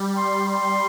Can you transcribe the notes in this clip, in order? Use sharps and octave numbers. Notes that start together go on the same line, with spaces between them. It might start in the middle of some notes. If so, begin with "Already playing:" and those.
Already playing: G3
C6
C6